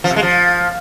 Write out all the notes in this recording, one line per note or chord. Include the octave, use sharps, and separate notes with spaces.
F3
C3
G#3
F3